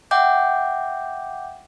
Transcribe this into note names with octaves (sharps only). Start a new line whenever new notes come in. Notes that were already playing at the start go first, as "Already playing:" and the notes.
E5 F#5 G5 D6 G6